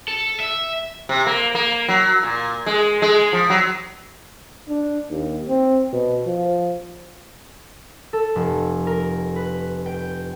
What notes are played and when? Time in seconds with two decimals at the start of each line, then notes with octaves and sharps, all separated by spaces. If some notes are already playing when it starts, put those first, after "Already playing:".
0.08 A4
0.40 E5
1.09 C3
1.26 A#3
1.55 A#3
1.89 F#3
2.23 A#2
2.66 G#3
3.02 G#3
3.33 F3
3.50 F#3
4.69 D4
5.10 D#2
5.49 C4
5.92 B2
6.26 F3
8.13 A4
8.36 F1
8.87 A#4
9.36 B4
9.86 G5